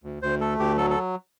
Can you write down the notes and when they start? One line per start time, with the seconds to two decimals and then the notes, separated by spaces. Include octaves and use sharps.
0.04 D2
0.22 D2 C5
0.41 A3 A4
0.59 D2 G4
0.78 F#3 A4
0.90 A4